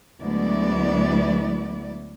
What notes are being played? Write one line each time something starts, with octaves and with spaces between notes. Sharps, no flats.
D2 F#3 G#3 B3 E4 D5